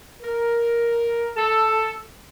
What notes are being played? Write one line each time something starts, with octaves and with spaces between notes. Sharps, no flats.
A#4
A4